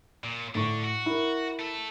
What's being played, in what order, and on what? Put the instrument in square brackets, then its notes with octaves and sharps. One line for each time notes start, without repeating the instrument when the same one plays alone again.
[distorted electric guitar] A#2
[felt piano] A2 E4 C#6 [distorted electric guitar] D3 D4
[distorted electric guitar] F#4
[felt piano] E4 A#4
[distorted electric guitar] A3 A4